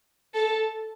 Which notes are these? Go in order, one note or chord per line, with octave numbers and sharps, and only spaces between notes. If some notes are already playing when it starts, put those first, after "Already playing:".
A4